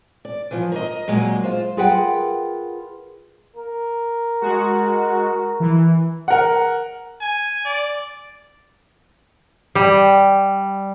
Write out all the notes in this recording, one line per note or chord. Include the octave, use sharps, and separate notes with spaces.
D5
E3 F3
A#4 C5 D#5
A#2 F#3 G#3 A#3
F4 C5
F4 G#4 A#4 B4 F#5 G5
A#4
G#3 F#4
E3
A#4 F#5
G#5
D5
G3